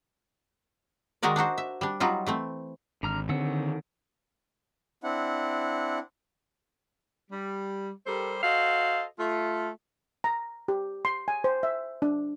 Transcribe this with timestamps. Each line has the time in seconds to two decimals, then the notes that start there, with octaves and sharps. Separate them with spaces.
1.23 D#3 G#3 D#4 F#4 A#4 D5
1.36 D4 D#4 F#4 C5
1.58 E5
1.81 G3 D4
2.00 F#3 G3 D#4 F4
2.26 E3 A3 C4
3.03 G#1 D3 A#5 F6
3.29 D3 D#3 C4 F#5 E6
5.03 C4 D4 E4 F#5
7.31 G3
8.06 G3 G4 A4 A#4 C5
8.43 F#4 A4 C5 D#5 F5
9.18 A3 F4
10.24 A#5
10.68 G4
11.05 C6
11.28 G#5
11.44 C5
11.63 E5
12.02 D4